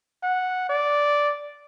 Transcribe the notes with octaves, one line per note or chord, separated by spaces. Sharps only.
F#5
D5